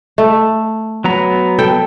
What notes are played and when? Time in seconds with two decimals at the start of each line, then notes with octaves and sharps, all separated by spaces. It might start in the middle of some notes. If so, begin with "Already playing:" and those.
0.18 A3
1.04 F#3 B3 A#5
1.59 A4 G5